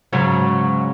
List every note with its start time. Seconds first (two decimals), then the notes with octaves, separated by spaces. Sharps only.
0.13 G#2 C#3 F#3